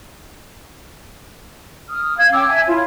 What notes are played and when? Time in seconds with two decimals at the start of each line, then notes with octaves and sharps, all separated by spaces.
1.89 D#6 F6
2.17 F5 G#6
2.33 C#4 G5 D6 E6
2.48 E5 G#5 A5 G#6
2.67 E4 F4 C#5